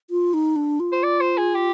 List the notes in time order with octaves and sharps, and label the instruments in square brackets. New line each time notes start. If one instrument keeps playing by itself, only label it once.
[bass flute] F4
D#4
D4
F4
[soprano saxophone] C5
D5
C5
G#4
G4